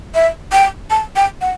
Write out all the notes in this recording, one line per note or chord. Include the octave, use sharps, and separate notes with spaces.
E5
G5
A5
G5
F#5